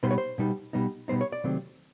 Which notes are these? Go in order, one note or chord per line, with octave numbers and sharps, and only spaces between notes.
B2 G3 B3 D#4 C5
C#5
C5
B2 G3 B3 D#4
B2 G3 B3 D#4
B2 G3 B3 D#4 C5
C#5
D5
C3 D#3 F#3 A3 C4